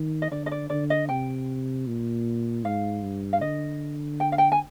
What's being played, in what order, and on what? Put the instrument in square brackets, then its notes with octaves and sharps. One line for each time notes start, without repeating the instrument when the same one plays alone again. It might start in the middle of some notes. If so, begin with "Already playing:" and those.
Already playing: [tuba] D#3
[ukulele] D#5
[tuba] D3 [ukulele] D5
[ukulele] D#5
D5
[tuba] D3 [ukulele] D5
[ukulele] D#5
[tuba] C3 [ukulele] G5
[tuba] A#2
[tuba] G#2 [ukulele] F5
[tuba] G2
[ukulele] F5
[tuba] D3 [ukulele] D#5
[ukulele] G5
F5
G5
G#5